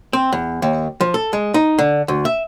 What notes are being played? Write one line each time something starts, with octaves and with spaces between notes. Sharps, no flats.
C4
E2
D#2
F3
A4
G#3
D#4
D3
D2
E5